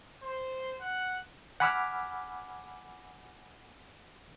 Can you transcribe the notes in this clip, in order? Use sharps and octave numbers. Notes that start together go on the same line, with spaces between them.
C5
F#5
F#5 G#5 B5 D6 E6 F6